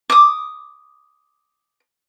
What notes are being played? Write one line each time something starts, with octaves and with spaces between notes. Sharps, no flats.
D6 D#6